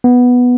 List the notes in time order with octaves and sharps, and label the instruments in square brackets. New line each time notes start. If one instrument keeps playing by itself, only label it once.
[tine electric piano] B3